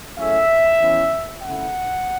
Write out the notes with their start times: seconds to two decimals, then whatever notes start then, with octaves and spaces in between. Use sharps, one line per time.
0.16 F#2 C#3 A3 C#4 E4 E5
0.80 E2 E3 C#4 E4
1.42 C#3 A3 E4 F#5